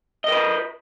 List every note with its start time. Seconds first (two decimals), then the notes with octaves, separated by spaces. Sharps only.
0.24 D#5
0.28 A#4
0.32 B4